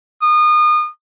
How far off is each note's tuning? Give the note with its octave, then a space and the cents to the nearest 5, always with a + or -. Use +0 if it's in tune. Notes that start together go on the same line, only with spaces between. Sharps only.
D#6 -30